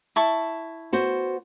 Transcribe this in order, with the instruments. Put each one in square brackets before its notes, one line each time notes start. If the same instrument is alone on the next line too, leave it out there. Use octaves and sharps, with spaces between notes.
[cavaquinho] E4 A5 C#6
[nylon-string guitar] B3 F#4 C5